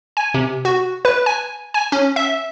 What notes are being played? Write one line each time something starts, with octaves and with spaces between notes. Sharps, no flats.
G#5
C3
F#4
B4
G#5
G#5
C#4
E5